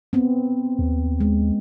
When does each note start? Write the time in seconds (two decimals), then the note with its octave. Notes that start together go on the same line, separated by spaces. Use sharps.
0.13 B3 C4
0.79 D#2
1.21 G#3